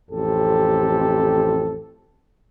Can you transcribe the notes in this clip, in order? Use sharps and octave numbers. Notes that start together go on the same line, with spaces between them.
A1 F2 C4 G4 A4